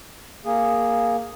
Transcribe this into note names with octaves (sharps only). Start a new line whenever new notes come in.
A#3 G#4